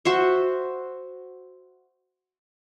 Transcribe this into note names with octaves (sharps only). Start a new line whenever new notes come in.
F#4 C5 E5